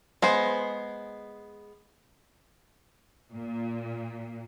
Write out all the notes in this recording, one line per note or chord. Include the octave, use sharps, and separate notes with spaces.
G#3 B3 C5
A#2